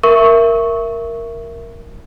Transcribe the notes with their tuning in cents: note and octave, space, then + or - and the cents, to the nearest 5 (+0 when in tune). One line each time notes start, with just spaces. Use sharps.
A#4 +0 E5 +15 C#6 +0